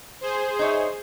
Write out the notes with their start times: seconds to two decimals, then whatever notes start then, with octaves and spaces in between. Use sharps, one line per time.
0.21 G#4 C5
0.59 D#4 C#5 E5